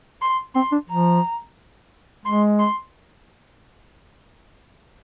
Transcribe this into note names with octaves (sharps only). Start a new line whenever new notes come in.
C6
C4 C6
D4
F3 A#5
G#3 C6
C6